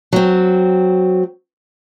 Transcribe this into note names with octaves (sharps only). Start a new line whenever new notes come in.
F#3 C4